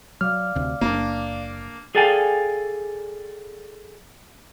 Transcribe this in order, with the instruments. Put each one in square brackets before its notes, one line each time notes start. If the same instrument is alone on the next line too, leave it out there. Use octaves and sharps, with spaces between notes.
[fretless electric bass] F#3 [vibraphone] D5 F5 D6 [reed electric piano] F6
[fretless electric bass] D2 C3
[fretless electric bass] F#1 [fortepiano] A#3 D4
[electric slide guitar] G#4 A4 D5 F5 G5 G#5